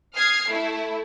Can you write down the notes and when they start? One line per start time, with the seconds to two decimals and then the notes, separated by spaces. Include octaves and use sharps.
0.16 D#6 F6 G#6 C7
0.48 A3 E4